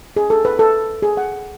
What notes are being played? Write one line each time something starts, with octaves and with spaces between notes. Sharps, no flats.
G#4
A4
B4
A4
G#4
F#5